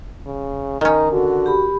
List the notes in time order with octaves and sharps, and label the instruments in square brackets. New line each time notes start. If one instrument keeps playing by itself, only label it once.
[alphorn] C#3
[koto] D#3 C#4 [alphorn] D#4
[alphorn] D3 [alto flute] F#4
[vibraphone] G4 B5